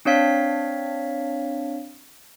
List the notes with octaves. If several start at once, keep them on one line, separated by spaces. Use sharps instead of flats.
C4 D4 C#5 F5 B6